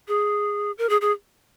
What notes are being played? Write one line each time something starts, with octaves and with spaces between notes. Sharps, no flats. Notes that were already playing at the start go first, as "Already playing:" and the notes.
G#4
A#4
G#4
G#4